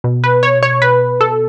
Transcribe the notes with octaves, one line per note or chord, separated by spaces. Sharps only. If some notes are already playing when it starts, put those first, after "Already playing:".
B2
B4
C#5
C#5
B4
A4